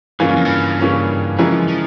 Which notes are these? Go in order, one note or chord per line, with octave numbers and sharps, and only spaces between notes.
G#2 C#3 E3 A#3 C#4 F4
G2
F2
G2
C#3 E3 A#3 C#4 F4
C#3 E3 F3 G#3 E4 A#4
F3